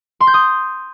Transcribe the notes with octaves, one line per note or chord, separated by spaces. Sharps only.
C6
G6
D#6